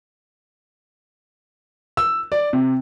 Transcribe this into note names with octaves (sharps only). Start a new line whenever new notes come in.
E6
D5
C3